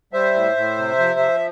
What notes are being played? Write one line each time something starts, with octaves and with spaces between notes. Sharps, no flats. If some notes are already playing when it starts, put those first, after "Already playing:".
G3 C5 E5
A2
A2
C3
F3
F3